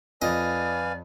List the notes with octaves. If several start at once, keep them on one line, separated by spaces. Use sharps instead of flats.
F2 B4 D5 D#5 F5 G#5